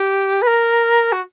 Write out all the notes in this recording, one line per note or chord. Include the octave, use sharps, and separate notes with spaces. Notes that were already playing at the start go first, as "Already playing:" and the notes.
Already playing: G4
B4
A#4
F#4